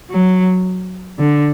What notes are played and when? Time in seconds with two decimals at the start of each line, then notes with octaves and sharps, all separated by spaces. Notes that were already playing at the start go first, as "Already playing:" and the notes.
0.10 F#3
1.19 D3